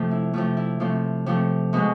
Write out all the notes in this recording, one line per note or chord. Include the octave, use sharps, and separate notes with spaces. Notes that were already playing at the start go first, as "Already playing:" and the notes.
Already playing: C3 F3 A3
E4
C3 F3 A3 F4
E4
C3 F3 A3
C3 F3 A3
B2 G#3 D#4